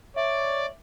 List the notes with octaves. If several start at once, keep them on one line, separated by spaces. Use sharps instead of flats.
C#5 D5 E5